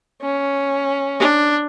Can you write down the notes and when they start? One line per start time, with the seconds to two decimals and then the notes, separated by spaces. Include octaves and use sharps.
0.21 C#4
1.19 D4